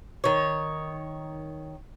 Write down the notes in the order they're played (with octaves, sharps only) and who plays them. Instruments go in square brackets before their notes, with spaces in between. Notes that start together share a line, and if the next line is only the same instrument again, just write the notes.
[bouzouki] D#3 C#5